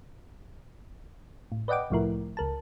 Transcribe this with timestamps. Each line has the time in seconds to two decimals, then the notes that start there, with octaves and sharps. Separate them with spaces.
1.52 A2
1.68 B4 D5 D#5 F#5 G5 D6
1.90 C2 A2 F3 A3 E4 A#4
2.37 C#2 A#4 A5